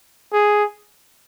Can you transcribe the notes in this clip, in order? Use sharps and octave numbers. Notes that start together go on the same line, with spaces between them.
G#4